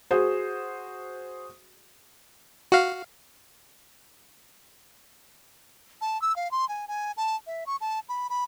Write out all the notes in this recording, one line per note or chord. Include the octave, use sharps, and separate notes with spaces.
F#4 G#4 C5
F#4 F5
A5
E6
F5
C6
G#5
G#5
A5
E5
C#6
A5
B5
B5